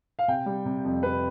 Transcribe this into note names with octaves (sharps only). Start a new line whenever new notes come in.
F5
C3 G5
G3
C3
F2
C3 B4